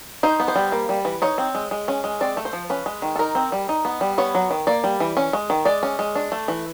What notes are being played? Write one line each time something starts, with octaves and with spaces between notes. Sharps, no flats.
D#4 C5
B3
C5
G3
A#3
G3
E3
D#4 C#5
C4
G#3
G#3
C#4
G#3
C4 D5
A3
C5
F3
C#4 B4
G#3
D#3
A4
D#4 A#4
C4
G3
D#4
B3
G3
B3 C#5
F#3
D#3
A#3 D5
G3
E3
C#4
G#3
D#3
G#3 D5
C#4
G#3
D4
A3
E3